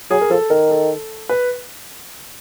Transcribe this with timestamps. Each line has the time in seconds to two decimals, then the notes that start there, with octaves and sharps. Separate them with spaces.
0.11 F#3 G#4
0.21 A#4
0.30 F3 A4
0.50 D#3 A#4
0.70 A4
1.29 B4